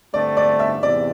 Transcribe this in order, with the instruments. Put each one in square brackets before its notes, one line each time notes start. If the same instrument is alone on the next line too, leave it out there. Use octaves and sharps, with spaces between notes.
[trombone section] G2 D3 A3 C4 [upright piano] D5
[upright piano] D5
E5
[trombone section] E2 C3 [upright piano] D5